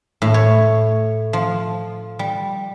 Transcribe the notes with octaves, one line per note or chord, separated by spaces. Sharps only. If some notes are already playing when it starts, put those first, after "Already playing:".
A2
C#5
F3
G3